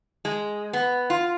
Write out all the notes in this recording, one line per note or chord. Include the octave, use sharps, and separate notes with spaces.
G#3
B3
F4